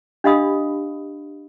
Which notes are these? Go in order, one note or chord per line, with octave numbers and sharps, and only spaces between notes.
D4 G4 D#5 F5 B5 D#6